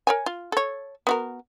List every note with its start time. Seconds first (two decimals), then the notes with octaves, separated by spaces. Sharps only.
0.07 A#4 C#5 G#5
0.26 F4
0.52 A4 C#5
1.07 B3 F#4 A#4